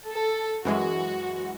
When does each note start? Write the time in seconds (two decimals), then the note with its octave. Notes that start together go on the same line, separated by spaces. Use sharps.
0.10 A4
0.65 F#2 E3 G#3 F#4